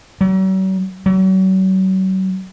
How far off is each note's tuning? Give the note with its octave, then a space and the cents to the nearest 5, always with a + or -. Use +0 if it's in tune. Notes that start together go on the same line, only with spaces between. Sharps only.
F#3 +45
F#3 +40